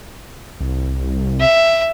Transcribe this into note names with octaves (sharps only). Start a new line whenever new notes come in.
C2
E5